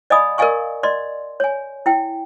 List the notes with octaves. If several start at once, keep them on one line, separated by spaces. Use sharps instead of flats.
D5 D#5 F5 G#5 B5 D#6
A#4 D5 D#5 F5 G#5 C#6
D5 D#5 C6
C#5 G#5
E4 G5